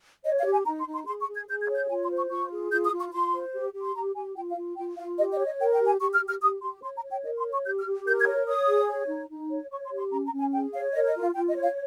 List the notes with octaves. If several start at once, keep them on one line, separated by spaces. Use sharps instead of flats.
C#5 D#5
F5
G4
G#5
D#4 A#5
C6
D#4
C6
G#4 C6
C#6
G#4
G#6
G#4 G6
G#6
C#5
G6
F4 G#5
C6
C5
C#6
F4 C#6
G#4
F4 G6
D#6
F4
C#6
F4 C6
C5
G4
G4
C6
G4 A#5
G4 G#5
F4 G5
F5
F4
F4 G5
F4 F5
G4 D#5
D#5
C#5
D#5
A#4 G5
G5
G4
G#5
G4 C#6
F6
G4
F6
G4 D#6
G4 C6
C#5 C6
A#5
C#5
G5
A#4 D#5
C6
C#5
C#6
G4 G6
F6
G4
A#4 G6
G#6
C#5
C#5 D#6
G#4
C#5
D#4
D#4
C#5
C#5 C#6
C6
G4
C6
C#4 A#5
A#5
C#4
G#5
G#4 G5
C#5 F5
A#4 D#5
D#5
F4
F5
F4 G5
D#5
C#5
F5